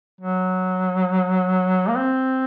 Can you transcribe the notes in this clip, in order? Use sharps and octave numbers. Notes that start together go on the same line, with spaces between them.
F#3
A#3
C4